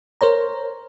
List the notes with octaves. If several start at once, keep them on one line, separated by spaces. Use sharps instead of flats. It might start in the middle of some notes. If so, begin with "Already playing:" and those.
A#4 C5 C#5 A#5